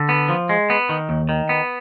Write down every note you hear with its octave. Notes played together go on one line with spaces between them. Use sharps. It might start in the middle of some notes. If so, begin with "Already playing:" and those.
Already playing: D3
B3
F3
G#3
B3
D#3
D#2
D#3
B3